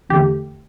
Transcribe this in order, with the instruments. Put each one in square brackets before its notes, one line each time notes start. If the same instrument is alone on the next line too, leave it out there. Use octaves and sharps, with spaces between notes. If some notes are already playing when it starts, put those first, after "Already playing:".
[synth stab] E2 D3 A3 G4